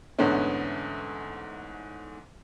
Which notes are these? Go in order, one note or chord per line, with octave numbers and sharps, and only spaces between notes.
E2 G#2 D3 A3 B3 C#4